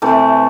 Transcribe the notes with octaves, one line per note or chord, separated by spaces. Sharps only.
C3 E3 A3